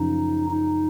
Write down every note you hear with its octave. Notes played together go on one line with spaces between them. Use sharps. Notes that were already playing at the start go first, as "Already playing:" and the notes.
Already playing: F#2 C#3 F3 D#4
D#4